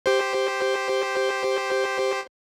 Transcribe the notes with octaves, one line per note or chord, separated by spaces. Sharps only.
G4 C5